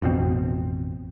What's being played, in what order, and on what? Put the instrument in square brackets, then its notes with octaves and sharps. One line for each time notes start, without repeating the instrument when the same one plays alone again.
[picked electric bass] A1 F2 B2 C4